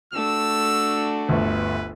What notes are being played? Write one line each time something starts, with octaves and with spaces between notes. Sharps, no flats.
A3 D4 F#4 E6
G1 D2 B4